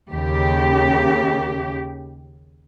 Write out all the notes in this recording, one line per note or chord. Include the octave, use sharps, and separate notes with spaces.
D#2 C#3 G4